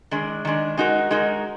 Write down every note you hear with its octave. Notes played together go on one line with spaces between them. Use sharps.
D#3 G#3 D4
D#3 G#3 D4
G#3 D#4 F#4 A#4
G#3 D#4 F#4 A#4